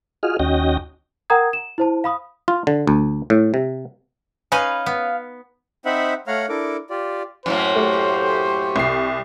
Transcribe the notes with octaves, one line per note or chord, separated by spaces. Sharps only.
F4 F#4 G#4 D#5 F6
D#2 C#4 F#4 D#5 G5 A#6
A#4 F#5 G5 A#5 D#6 G#6
E7
E4 C5 A5
F5 B5 D#6
F4
D3
D2
A2
C3
C#4 D#4 B4 F5 G#5
B3
C4 D#4 C5 E5 F#5 B5
A3 C#5 F5 F#5 A#5 F6
D4 E4 A4 A#4 D6
F4 G4 D5
F#2 A2 A#3 C5
A3 G4 C#6
C2 C7